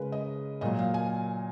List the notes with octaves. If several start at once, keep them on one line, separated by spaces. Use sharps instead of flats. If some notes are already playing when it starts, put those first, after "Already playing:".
Already playing: C#3 G#3 A#4 B4
D#5
A#2 F#3 D#5
F5
G#5